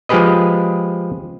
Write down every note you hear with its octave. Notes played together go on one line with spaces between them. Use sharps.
F3 G#3 G4 G#4 B4 D#5